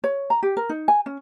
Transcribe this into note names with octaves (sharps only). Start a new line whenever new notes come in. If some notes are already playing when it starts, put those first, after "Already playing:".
C#5
A#5
G4
A#4
D#4
G#5
C#4